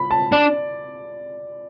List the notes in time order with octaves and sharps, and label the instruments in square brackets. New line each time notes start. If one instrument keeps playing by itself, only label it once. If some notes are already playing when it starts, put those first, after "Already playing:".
Already playing: [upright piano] B5
A5
[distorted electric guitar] D4 [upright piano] D5